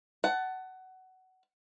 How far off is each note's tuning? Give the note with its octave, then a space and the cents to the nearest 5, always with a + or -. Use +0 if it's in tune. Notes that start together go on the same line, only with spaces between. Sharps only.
F#5 +20 A5 +0